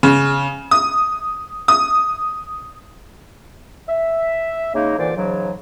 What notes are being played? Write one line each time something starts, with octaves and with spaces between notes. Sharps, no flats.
C#3
D#6
D#6
E5
C#3 G#3 A#3 D#4
A#2 D3 E3 C5 D5
G#2 C#3 E3 F#3